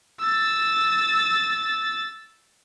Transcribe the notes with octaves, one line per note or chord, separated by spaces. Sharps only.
E6 A6